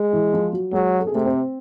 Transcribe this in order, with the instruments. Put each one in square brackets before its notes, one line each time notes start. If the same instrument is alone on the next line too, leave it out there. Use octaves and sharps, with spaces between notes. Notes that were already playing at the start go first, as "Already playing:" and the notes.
Already playing: [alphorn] G#3
[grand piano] E3 E4
F3 F4
F#3 F#4
[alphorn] F#3 [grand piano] G#3 G#4
[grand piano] A4
G#4
[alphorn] C3 [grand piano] A3 A4
[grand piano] C4 C5